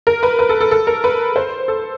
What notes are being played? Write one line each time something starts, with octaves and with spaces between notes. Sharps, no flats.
A#4
B4
B4
A4
A4
A4
A#4
B4
C5
A4